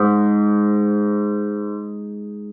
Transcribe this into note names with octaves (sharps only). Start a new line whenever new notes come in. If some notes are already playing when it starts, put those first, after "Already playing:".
Already playing: G#2